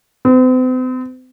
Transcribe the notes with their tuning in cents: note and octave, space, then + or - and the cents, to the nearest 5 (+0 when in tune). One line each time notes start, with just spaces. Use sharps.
C4 -45